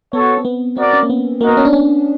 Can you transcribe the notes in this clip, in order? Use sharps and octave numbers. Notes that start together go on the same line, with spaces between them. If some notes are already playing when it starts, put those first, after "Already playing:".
B3 F#4 A4 C#5
C4
B3
C4 F#4 A#4 D5
C#4
A#3
B3
A#3 D#4 F#4 A#4 D#5
B3
C#4
D4
C#4